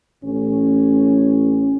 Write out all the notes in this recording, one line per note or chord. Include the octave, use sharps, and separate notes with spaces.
A1 A2 C#4